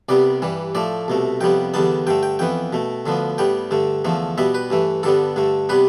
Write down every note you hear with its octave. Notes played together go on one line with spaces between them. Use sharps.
C2 C3 G3 B3 D5
G2 E3 G3
A2 F3 A3 D5
C2 B2 A3
F2 C3 G3 B3 G5
E2 D3 G3 B3 A5
G2 D3 A3 G5
G5
F2 E3 B3 G5
B2 A3
D2 D3 F3 B3
A2 G3 B3 G5
G2 D3 A3
E2 D3 F3 A3
B2 G3 B3 E5
B4
G2 E3 A3
G2 D3 G3 B3 A4
G2 D3 A3
C3 G3 B3 B4